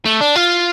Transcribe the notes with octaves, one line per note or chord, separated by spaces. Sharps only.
A3
D4
F4